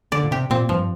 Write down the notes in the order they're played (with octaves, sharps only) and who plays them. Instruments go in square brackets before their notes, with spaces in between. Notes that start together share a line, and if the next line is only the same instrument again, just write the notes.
[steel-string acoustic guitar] D3 [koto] D5
[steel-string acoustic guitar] A#2
[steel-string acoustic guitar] C3 [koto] G4
[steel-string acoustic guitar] A#2 [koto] C4
[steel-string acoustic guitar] G2 [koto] F3